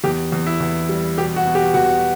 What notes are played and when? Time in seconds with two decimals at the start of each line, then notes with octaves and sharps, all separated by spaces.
0.04 E2 G4
0.32 E2
0.47 E4
0.60 E2
0.89 G3
1.18 B2 G4
1.36 F#4
1.46 B2
1.55 G4
1.74 E2 F#4